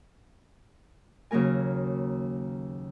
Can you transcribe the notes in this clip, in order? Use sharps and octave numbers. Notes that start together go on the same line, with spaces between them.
D#2 C#3 F#3 A#3 A#4 G#5